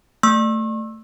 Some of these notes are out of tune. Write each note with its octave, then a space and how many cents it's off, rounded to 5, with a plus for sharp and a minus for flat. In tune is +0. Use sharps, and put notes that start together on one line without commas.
A3 +15 C#6 -40 E6 +0